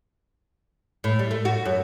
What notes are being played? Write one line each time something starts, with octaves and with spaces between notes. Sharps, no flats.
A2
G3
A3
F#4
F#2